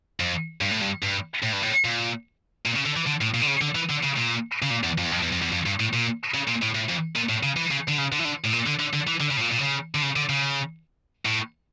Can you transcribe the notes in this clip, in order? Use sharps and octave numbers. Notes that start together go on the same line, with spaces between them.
F2
G2
A2
G2
G2
A2
G2
A2
A#2
A#2
C#3
D3
E3
D3
A2
A#2
D3
C#3
D3
E3
D3
C#3
A#2
C#3
A#2
E2
F2
E2
F2
E2
F2
E2
F2
G2
A2
A#2
C#3
A#2
A2
A2
F2
A#2
A2
C#3
E3
C#3
D3
C#3
D3
E3
D3
A2
A#2
D3
D3
D3
E3
D3
C#3
A2
A#2
A#2
D3
C#3
D3
C#3
D3
C#3
A2